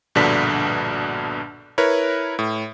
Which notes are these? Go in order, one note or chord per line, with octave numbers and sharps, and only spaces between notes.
A#1 G2 B2 D3 D4 B6
E4 A#4 B4 C#5
A2